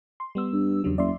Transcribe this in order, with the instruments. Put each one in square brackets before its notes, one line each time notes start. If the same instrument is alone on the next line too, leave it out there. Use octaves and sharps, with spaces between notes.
[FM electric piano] C6
G3 B3 E6
[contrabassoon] G2
[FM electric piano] E2 C#3 F#3 [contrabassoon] G2
[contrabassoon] F#1 [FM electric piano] D5 E5 C6